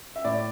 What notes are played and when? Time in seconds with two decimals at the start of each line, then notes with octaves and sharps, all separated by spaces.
0.16 E5
0.24 A2 D5